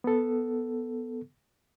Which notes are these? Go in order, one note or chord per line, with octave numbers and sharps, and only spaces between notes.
B3 A4